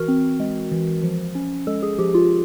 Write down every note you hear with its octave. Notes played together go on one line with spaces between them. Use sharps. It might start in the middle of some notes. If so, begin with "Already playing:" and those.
Already playing: E3 F#4 A#4
C4
G#3
E3
F3
C#4
G#3 A4
G#4
F3 G4
F4